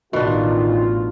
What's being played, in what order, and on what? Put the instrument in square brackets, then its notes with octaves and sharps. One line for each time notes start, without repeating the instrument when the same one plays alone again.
[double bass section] A1 [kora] B2 D4 [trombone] D#3 [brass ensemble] F4